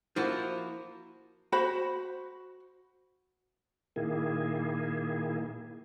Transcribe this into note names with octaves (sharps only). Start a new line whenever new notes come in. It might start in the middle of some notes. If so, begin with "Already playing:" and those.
F3 A#3 E4 F#4
F#4 C5 B5
A#2 D#3 A#3 E4 G#4